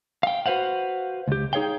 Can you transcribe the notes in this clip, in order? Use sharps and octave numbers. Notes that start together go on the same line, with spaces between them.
F5 G5
F#4 B4 C5 F5 F#5
C#2 G4
D#4 G#4 C#5 F5 G5